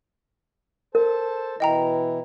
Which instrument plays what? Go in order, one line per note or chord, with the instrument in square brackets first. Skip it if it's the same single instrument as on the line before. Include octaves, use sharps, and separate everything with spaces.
[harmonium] A4 C5 A5 [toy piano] A#4
[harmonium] B2 E3 E4 [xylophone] D#5 G5 A#5